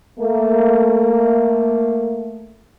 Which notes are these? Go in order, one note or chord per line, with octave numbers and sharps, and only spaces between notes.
A3 A#3